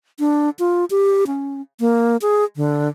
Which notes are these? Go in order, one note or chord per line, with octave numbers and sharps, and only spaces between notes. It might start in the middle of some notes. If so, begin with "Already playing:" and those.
D4
F4
G4
C#4
A#3
G#4
D3